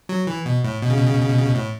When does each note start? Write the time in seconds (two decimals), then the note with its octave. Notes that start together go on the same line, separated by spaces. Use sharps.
0.09 F#3
0.27 E3
0.46 B2
0.64 A2
0.82 B2
0.90 C#3
0.97 B2
1.06 C#3
1.13 B2
1.21 C#3
1.29 B2
1.38 C#3
1.46 B2
1.55 A2